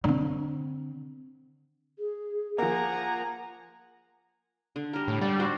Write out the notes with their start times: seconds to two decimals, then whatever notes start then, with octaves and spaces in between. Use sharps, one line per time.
0.04 D3 C4
1.99 G#4
2.58 F3 A#3 F#5 G#5 A#5
4.76 D3
4.93 G3 A#4
5.08 A2
5.21 G3 D5 F#5
5.40 D4 F#4 C5